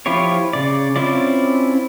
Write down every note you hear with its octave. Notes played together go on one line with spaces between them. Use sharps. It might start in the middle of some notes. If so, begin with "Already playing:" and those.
F3 E4 F4 G4 C#5
C#3 D5
C4 C#4 E4 F4 D5